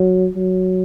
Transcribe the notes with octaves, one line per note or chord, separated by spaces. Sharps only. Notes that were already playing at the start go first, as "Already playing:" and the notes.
Already playing: F#3
F#3